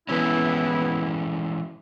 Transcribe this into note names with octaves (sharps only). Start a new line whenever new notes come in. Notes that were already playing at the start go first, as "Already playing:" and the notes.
E3 G#3 B3 C#4 E4